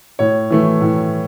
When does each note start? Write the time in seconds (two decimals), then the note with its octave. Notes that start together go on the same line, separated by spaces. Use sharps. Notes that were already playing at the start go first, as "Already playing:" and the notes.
0.19 A2 C#5
0.50 E3 A3
0.81 A2